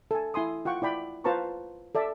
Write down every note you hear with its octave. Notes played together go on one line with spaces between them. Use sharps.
A4 G#5
E4 G#5 C6 D#6
F4 F#5 G5 C#6
E4 D5 G5 B5
F4 B4 C5 A5 A#5 C#6
A4 D5 E5 A5